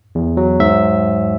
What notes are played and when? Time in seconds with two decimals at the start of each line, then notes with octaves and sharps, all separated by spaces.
0.15 E2
0.37 F#3
0.60 G#2 E5